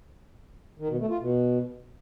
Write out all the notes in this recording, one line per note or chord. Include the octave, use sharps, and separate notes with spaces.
D#3
B2
A3
F4
B2